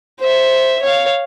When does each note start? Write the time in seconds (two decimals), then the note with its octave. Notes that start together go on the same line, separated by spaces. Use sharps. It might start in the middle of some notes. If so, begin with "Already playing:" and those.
0.19 C5 E5
0.82 C#5 F5